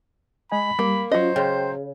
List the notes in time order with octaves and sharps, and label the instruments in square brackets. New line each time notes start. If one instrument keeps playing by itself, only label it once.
[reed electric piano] G#3 D#5 G#5 [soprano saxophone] B5
[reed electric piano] G3 [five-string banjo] A#3
[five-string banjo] F#3 D#5 [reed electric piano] C#4 F4 [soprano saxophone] C5
[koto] C#3 [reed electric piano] G5 C6